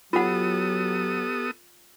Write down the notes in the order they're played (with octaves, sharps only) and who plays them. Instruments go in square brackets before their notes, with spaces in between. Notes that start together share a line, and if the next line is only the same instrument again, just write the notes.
[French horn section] F#3 [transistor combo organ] B3 A4 D#6 [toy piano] F4 F#5 [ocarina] G4